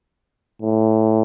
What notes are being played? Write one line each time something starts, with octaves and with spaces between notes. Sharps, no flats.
A2